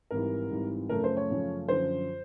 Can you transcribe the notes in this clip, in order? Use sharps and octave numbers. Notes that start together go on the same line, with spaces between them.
G#1 G#2 E3 G3 A#4
G#1 G#2 E3 G3
F#2 C#3 F3 A3 C#4 A#4
C5
C#5
F#2 C#3 F3 A3 C#4
F#2 D3 F3 C5